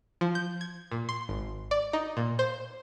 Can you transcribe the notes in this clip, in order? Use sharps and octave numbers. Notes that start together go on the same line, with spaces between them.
F3
G6
G#6
A#2
C6
G#1
D5
D#4
A#2
C5